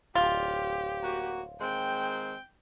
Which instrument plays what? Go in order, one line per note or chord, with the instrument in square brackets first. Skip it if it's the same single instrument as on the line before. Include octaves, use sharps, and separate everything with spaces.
[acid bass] D1 [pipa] F4 [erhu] G4
[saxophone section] A#3 F#4
[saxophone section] D#3 G#3 C4 [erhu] G5